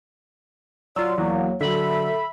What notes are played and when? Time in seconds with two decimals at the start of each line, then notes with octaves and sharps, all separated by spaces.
0.96 F#3 F4 D5 E6
1.18 E2 F#3 A#3
1.61 D3 F#3 A4 E5 B5